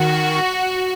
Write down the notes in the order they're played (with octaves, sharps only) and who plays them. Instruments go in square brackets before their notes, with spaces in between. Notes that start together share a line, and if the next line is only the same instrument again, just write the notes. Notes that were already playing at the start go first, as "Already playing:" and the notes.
Already playing: [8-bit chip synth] D#3 [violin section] F#4